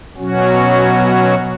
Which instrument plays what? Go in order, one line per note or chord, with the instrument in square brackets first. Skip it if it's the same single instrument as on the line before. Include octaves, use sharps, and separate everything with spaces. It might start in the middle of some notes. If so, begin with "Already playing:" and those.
[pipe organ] B2 F#3 C#4 F#4